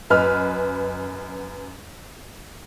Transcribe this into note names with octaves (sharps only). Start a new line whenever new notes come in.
F#2 B4 D#5 F6